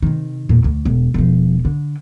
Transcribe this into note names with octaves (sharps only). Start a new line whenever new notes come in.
C3 D#3
E2 A#2
D2
E1
E1 F3
D3